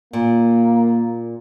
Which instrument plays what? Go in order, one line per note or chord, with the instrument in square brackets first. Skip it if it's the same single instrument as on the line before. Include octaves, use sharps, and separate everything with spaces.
[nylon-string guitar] A#2 [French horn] A#3